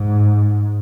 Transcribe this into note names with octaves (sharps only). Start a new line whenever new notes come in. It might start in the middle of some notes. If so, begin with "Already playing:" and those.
Already playing: G#2